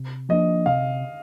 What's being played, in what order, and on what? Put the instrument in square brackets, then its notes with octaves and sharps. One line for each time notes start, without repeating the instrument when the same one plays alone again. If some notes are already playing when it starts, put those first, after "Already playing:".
Already playing: [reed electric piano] C3
[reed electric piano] F3 A#3 D4 [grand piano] D#5
[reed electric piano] C3 [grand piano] F5